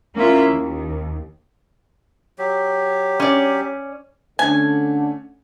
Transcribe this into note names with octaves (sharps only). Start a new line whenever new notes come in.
A#3 C#4 E4 F4 E5
D#2
F#3 G4
C#4 D5
D3 A3 C#4 G#5